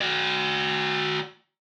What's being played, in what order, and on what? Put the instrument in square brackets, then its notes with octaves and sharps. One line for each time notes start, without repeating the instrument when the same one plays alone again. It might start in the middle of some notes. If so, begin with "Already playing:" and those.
[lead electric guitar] F#4 D5